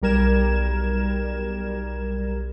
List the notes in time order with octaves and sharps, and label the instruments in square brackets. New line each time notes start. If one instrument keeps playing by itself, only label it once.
[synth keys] B1 G3 A#4 G#6 E7